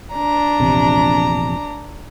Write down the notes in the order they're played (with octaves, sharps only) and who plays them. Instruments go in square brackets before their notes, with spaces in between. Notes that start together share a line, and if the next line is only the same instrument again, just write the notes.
[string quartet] D4 A#5
[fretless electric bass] A#1 E2 C3